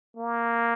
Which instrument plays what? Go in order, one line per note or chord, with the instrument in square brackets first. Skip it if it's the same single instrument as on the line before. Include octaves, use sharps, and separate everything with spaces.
[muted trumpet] A#3